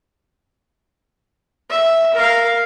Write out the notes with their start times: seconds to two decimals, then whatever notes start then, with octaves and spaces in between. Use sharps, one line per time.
1.70 E5
2.14 A#4 F5